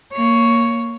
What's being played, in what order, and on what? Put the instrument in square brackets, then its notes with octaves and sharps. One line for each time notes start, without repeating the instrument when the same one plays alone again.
[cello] A#3 C#5